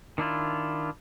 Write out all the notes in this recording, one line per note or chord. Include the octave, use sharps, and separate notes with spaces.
D#3 D4 E4 F4